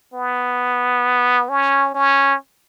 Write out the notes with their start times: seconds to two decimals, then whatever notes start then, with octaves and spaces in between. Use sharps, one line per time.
0.14 B3
1.49 C#4
1.94 C#4